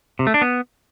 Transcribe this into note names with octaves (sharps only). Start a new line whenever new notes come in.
C3
A3
D4
B3